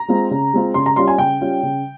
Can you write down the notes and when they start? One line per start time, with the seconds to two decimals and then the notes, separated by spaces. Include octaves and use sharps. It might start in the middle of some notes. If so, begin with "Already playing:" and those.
Already playing: A#5
0.08 G#3 C4 F4
0.31 C#3
0.53 G#3 C4 F4
0.74 C#3 C6
0.86 A#5
0.96 G3 C#4 F4 C6
1.08 G#5
1.18 C#3 G5
1.40 G3 C#4 F4
1.63 C#3